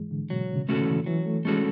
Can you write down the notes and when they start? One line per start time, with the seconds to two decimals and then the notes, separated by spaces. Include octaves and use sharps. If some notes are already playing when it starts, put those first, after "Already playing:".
Already playing: G#2 E3 G#3
0.11 D3
0.30 B2 F#3
0.56 C#3
0.69 A3 C#4 F#4 A4
0.82 E3
1.06 E3 F#3
1.26 A3
1.45 G#3 A3 C#4 F#4 A4